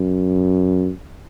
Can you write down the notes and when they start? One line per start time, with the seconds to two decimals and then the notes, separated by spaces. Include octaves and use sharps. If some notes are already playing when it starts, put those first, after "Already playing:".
Already playing: F#2